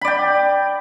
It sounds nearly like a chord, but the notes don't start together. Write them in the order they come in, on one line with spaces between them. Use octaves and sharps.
B5 D5 G5